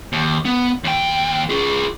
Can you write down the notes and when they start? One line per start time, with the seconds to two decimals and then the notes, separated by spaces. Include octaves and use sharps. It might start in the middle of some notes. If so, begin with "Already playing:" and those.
0.13 D#2
0.45 B3
0.84 D#2 G5
1.50 F4 G#4